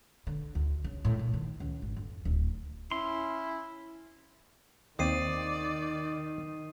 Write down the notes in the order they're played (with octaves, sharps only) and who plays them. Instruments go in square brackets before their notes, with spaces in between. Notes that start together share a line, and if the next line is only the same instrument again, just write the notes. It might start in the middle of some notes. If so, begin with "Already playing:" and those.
[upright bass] D3
D2
C#3
A2
A#2
D#3
C#2
G#1
F2
D1
[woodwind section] C#4 [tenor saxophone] E4 [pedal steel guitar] C6
[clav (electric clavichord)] D#2 C4 [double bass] D#3 [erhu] D5 [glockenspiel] D#6 C7 D#7